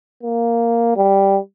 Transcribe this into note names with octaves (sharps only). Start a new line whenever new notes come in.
A#3
G3